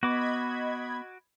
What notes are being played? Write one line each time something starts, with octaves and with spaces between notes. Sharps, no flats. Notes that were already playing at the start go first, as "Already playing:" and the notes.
B3 F#4 D#5 B5 D6 G#6